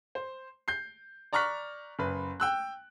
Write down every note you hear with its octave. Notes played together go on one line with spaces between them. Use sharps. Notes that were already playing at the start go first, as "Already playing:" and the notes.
C5
G6 C7
D5 A#5 C#6 F6 F#6 B6
F#1 B4
G5 E6 F#6